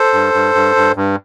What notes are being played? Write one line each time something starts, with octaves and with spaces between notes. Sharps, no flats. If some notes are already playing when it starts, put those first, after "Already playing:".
Already playing: A4 C5
G2
G2
G2
G2
G2